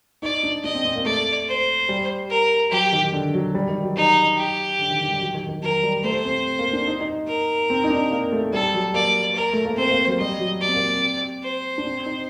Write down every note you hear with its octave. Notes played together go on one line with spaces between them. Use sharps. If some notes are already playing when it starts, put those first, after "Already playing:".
D#4 D5
D4
D4 D#5
C4
C4
A#3
A3 D5
C5
G3
A#4
F#3 G4
D#3
D3
F#3
G3
D#3
F#3
D#4
G4
D3
D#3
D#3
G3
F#3
D#3
D#3
F#3 A#4
G3
A3 C5
C4
A#3
D4
D#4
D#4
A#4
C4
D#4
D4
A#3
A3
G3 A4
F#3
A#3 D5
A#4
A3
A#3
C4 C5
A#3
F#3
G3 D#5
F#3
D5
C4
A#3
C4
C5
D4
C4
D#4